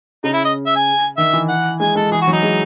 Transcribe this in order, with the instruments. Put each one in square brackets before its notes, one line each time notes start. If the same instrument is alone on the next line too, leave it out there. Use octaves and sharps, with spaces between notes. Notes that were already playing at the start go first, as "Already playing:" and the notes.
[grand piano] C#3 [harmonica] D#4
[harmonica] E4
D#5
E5
G#5
[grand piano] D#3 [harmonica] E5
[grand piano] E3
[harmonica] F#5
[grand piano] G#3 [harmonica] G#5
[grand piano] G#3 [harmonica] A4
[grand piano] E3 [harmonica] G#4
[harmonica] F#4
[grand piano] F#3
[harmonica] D#4
[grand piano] G#3